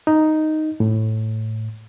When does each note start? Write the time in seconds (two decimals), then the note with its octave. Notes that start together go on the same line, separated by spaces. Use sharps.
0.07 D#4
0.80 A2